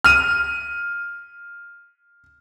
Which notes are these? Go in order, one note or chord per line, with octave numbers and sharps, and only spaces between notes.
F6 D#7